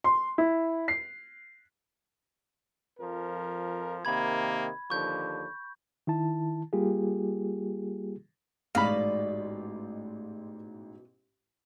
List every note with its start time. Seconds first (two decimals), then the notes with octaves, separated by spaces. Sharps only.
0.04 C6
0.38 E4
0.88 C7
3.00 F2 F3 A#4
4.05 C3 D#3 A#3 B5 G#6
4.90 D#2 D3 F3 C#6 G6
6.07 D#3 E4 A5
6.73 G3 A#3 F4 G4 G#4
8.75 A1 G#2 B2 D5 F5 B5